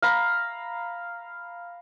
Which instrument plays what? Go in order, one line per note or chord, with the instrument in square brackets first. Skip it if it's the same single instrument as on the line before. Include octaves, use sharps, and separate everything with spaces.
[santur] F5 A#5 B5